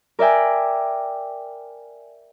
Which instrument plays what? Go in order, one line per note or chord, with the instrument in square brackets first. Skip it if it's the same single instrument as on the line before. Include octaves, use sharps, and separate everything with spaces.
[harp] A#4 D5 E5 G5 G#5